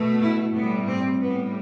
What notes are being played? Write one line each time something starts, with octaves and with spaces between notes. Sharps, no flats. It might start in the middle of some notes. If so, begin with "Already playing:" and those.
Already playing: B2 A3
E4
A2 G3 B3
C4
A2 G3 B3